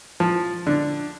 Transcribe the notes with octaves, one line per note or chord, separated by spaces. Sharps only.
F3
D3